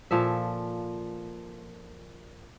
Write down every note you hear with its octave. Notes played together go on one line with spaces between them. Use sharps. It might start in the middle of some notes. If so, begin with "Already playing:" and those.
A#2 F3 A4 E5